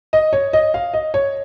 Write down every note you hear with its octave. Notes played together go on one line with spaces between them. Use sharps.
D#5
C#5
D#5
F5
D#5
C#5